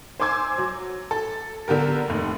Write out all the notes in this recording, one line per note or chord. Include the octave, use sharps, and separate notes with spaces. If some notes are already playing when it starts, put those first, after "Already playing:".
C5 G#5 C6 D6 E6 G#6
F#3
A4
D3 B3 G4 A#4
F1 D#2